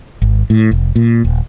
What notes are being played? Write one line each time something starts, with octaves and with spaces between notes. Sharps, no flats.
G#1
A2
F1
A#2
D#1